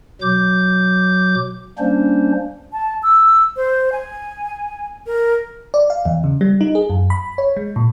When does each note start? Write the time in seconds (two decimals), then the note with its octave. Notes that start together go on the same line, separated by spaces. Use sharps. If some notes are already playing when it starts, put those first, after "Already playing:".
0.22 B2 F#3 D6 G6
1.79 G3 A#3 C#4 D4 C5
2.73 A5
3.03 E6
3.56 C5
3.92 G#5
5.06 A#4
5.74 D5
5.90 F5
6.05 E2
6.24 C#3
6.41 G3
6.61 D#4
6.75 G#4
6.90 F#2
7.10 B5
7.38 C#5
7.57 G#3
7.76 A#2